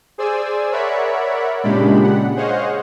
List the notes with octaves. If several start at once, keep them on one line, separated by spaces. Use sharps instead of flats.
G#4 C5 D5 G#5 E6
A#4 C#5 D5 E5 F#5 B5
A#2 C#3 G#3 D4 G4 B5
F#5
G#4 C5 C#5 D#5 F5 F#5